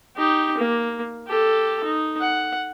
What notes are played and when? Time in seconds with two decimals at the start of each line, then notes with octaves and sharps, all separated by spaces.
0.17 D#4 G4
0.58 A#3
1.27 G4 A4
1.84 D#4
2.21 F#5